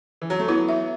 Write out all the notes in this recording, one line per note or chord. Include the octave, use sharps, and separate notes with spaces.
E3
F#3
A3
F#3 B3 E4
E5